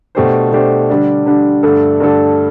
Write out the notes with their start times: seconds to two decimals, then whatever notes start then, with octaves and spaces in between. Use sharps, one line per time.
0.15 B2 A3 D4 G4 C5
0.52 B2 A3 D4 G4 C5
0.90 D3 G3 D4
1.26 D3 G3 D4
1.63 G2 D3 A3 D4 A4
2.00 G2 D3 A3 D4 A4